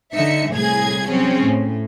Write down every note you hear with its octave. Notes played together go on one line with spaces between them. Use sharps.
D3 D#4 E5 C#7
C2 A2 G#4 G#6
F#3 C4 C#4 G#4
A2